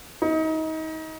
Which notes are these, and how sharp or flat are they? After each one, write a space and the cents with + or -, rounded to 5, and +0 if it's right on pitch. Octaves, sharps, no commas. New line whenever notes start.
D#4 +30